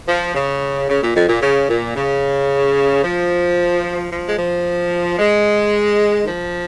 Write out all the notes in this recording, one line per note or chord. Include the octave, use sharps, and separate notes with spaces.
F3
C#3
C#3
A#2
F2
A#2
C#3
A#2
C#3
F3
F3
G#3
F3
G#3
D#3
F3